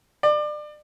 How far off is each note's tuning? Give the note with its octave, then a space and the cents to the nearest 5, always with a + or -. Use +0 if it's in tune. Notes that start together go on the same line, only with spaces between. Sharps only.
D5 +30